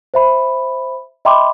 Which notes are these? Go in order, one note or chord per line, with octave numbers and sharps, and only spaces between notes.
C5 E5 B5
D#5 E5 G5 B5 C6 D6